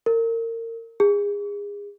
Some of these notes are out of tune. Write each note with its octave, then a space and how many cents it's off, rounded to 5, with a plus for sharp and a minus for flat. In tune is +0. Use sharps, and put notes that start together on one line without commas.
A#4 -30
G#4 -30